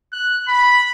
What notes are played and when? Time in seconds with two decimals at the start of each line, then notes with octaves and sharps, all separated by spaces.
0.13 F#6
0.48 B5